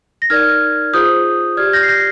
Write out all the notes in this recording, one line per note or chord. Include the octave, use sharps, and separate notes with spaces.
A#6
D#4 A#4 D5 F6 G#6
F4 G#4 C5 D#6 G6
G4 D5 F6 G#6
G6 A#6
C7
G6 A#6